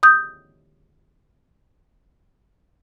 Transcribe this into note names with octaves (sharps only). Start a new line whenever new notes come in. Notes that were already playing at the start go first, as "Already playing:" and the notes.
D#6 G6